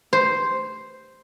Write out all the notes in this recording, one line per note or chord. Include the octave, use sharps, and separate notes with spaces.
C5